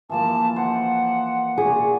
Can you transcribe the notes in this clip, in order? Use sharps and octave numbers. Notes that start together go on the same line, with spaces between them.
E3 F3 A#3 A5
C5 F#5
F#4 G#4 D5